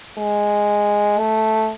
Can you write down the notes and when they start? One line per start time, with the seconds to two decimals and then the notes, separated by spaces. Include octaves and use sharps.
0.18 G#3
1.19 A3